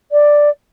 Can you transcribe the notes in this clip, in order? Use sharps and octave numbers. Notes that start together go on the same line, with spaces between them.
D5